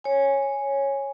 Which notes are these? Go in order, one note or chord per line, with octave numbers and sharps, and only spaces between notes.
C#5 G#5